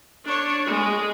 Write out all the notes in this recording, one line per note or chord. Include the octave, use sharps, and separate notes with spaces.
D4 C#5
G#3